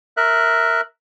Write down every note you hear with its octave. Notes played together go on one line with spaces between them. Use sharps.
A#4 E5 F#6